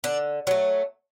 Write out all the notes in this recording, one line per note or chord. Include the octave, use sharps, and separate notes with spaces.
D3 D4
F#3 A3 C#4